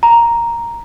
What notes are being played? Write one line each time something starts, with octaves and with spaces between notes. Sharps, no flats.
A#5